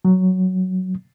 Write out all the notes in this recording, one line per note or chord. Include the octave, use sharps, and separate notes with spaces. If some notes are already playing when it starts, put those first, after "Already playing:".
F#3